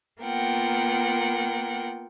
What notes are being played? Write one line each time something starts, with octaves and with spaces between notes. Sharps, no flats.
A#3 B3 F4 A#4 F#5 G5